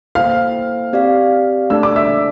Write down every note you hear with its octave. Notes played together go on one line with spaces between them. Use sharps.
A#3 E4 A4 C5 F5 G5 F6
C4 G4 D5 F5
A3 D4 A4 D5 A5 E6
D6
E5 E6